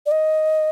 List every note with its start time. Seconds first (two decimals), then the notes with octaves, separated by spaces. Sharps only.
0.06 D5
0.11 D#5